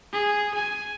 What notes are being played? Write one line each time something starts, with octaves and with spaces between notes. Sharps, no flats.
G#4
G#5